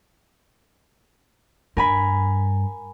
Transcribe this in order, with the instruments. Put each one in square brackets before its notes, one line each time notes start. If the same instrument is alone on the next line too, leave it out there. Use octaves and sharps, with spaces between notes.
[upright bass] G2 [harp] A#4 G#5 B5